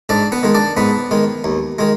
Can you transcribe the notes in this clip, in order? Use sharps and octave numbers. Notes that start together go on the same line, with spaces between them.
G#2 D4 D5
B3 B4
D#3 G#3
D4 D5
G#2 B3 B4
D#3 G#3
D#2
D#3 G#3